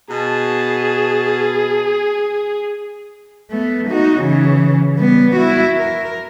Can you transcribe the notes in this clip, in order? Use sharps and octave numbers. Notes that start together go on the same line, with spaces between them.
B2 G#4 A5
A3 B3
D#4 F#4
C#3 E3
G3 B3
E4 F#4
A#4